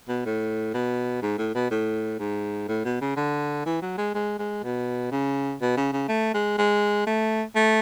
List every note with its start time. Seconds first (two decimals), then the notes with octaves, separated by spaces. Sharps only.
0.08 B2
0.25 A2
0.74 B2
1.22 G#2
1.38 A2
1.55 B2
1.71 A2
2.19 G#2
2.68 A2
2.85 B2
3.01 C#3
3.17 D3
3.66 E3
3.82 F#3
3.98 G#3
4.14 G#3
4.39 G#3
4.63 B2
5.11 C#3
5.61 B2
5.77 C#3
5.93 C#3
6.09 A3
6.34 G#3
6.58 G#3
7.07 A3
7.56 A3